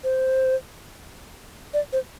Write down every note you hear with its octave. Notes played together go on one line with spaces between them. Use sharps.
C5
D5
C5